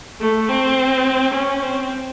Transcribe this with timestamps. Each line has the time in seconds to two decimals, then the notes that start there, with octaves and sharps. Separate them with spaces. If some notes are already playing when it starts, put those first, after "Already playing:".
0.21 A3
0.49 C4
1.34 C#4
1.63 C4